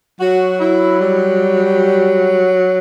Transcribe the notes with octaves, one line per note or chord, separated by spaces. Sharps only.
F#3 F#4
E4
G3